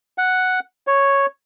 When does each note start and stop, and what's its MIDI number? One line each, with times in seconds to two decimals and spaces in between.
0.18 0.60 78
0.87 1.26 73